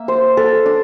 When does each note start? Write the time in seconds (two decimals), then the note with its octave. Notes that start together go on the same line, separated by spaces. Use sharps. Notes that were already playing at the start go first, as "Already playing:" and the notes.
Already playing: A#3 E5
0.08 C5
0.37 A4
0.66 D4